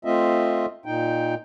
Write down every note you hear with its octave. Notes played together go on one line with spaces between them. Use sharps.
A3 C4 F4 D#5 E5
A#2 D#4 G5